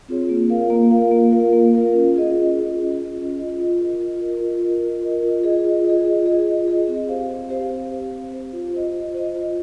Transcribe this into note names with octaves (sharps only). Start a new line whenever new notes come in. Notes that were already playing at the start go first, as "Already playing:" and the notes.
C4 F4 G#4 C#5
A#3
F4 A#4 F5
A#3
F4 A#4 F5
A#3
F4 A#4 F5
A#3
F4 A#4 F5
C#4
F4 G#4 D#5
C#4
F4 G#4 D#5
C#4
F4 G#4 D#5
C#4
F4 G#4 D#5
F4
A#4 D#5
F4
A#4 D#5
F4
A#4 D#5
F4
A#4 D#5
F4
G#4 D#5
F4
G#4 D#5
F4
G#4 D#5
F4
G#4 D#5
C4
G4 C5 F5
C4
G4 C5 F5
C4
G4 C5 F5
C4
G4 C5 F5
F4
C5 D#5
F4
C5 D#5
F4